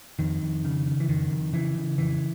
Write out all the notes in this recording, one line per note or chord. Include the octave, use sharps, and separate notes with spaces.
F2 D#3
F2
C#3
C#3
E3
F2 D#3
F2
C#3 E3
C#3
F2 E3